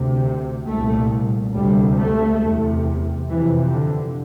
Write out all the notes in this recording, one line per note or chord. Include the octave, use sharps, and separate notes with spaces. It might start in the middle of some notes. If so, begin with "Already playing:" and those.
Already playing: D2 C3
C2 A#2 A3
D2 C3 G3
A3
E2 C3
F2 C3 E3
D3